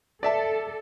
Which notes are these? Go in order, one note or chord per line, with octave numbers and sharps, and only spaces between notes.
A4 D5 E5 A5